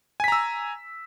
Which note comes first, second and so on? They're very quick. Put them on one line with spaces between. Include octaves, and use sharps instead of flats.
G#5 B6 A#5 E6